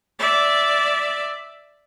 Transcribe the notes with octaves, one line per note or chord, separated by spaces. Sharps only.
D5 E5